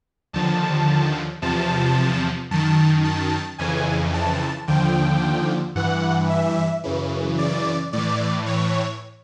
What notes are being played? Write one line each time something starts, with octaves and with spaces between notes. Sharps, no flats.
D#2 D3 F3 A5
E2 C3 F3 A5
F#2 D#3 A5
A5
F2 C#3 E3 G#5
A5
D#2 D3 F3 G5
G2 E3 F#5
E5
F#2 C#3 E3
D5
A2 E3 D5
C#5